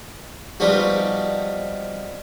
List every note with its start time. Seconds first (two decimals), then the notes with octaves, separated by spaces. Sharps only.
0.60 F3 G3 B3 C4 D#4 F#4